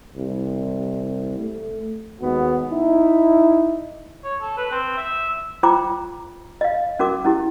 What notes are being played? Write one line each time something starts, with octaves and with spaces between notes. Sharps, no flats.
C2
A3
D#2 G#3 B3 F#4
D#4 E4
C#5
A4
B4
C4
E5
F4 C5 G5 A#5 D6
D#5 F5
C#4 F#4 A#4 D6
C#4 E4 G4